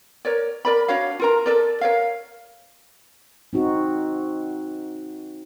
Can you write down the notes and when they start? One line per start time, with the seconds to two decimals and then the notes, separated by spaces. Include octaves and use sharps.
0.25 A#4 C#5 D5
0.65 A#4 D5 B5
0.88 D4 F#4 C#5 F5
1.20 F4 A#4 A#5
1.46 A4 A#4 D5
1.81 A#4 C#5 F5
3.53 C4 D#4 F#4